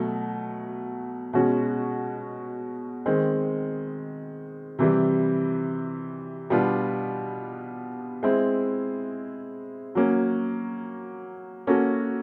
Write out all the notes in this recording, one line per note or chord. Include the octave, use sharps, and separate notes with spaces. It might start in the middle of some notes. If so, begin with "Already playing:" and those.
Already playing: B2 F#3 A3
B2 G#3 C#4 F#4
D#3 G#3 C4
C3 E3 G3
B2 G3 B3 D4 F4
G#3 C4 E4
F#3 A#3 C#4
A#3 C#4 F#4 A4